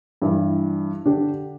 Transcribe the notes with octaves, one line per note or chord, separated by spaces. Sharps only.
G2 E3
D3 D4 G4